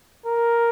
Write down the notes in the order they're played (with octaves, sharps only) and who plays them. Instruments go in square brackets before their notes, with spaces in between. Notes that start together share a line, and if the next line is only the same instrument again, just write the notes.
[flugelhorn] A#4